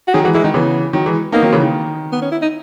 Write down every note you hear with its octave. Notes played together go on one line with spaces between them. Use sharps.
F#4
D#3 F#3 G#4
E3 G#3 F#4
E3 G#3 E4
D#3 D#4
C#3 E3 B3
D#3 F#3
E3 G#3
A#3 B3 D#4
D#3 F#3
C#3 E3
D#3
B3
C#4
E4
D#4